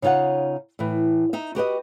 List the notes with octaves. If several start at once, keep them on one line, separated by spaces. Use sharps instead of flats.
C#3 D#4 F4 C#5 F#5
A2 E3
D#4 E5
F#4 G4 B4 D#5